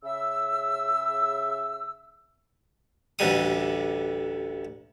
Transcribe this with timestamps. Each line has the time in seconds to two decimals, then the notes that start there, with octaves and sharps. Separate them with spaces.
0.04 C#3 E5 E6
3.19 A1 D2 D3 G3 D#6